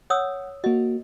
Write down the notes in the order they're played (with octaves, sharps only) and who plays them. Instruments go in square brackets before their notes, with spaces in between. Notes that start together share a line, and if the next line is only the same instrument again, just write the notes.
[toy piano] C#5 D#6 E6 [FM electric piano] F#5
[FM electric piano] A#3 F#4 [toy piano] D#5